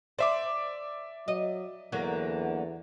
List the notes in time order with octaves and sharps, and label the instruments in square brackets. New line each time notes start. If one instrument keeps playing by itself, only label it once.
[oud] C5 [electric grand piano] D5 E5 D6
[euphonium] F#3 [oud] D#5
[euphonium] E2 [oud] D3 F#3 A#3